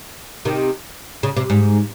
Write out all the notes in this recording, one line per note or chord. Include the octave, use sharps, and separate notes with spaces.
C3 D#3
C#3
C3
G#2